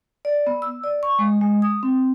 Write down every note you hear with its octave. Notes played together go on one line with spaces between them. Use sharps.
D5
B3
E6
D5
C#6
G#3
G#3
D#6
C4